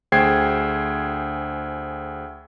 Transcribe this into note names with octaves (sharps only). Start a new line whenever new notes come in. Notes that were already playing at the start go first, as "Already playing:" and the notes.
D2 G#4 C5 G5 G#6 C7